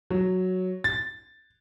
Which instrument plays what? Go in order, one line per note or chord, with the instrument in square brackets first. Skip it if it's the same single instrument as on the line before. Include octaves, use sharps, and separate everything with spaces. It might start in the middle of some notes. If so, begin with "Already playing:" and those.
[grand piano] F#3
A6